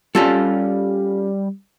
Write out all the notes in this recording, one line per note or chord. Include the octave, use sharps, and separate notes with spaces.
G3 C#4 F4 A4